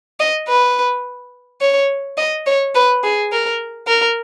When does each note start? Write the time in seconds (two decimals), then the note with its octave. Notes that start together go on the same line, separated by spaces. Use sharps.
0.20 D#5
0.48 B4
1.61 C#5
2.18 D#5
2.46 C#5
2.75 B4
3.03 G#4
3.32 A#4
3.88 A#4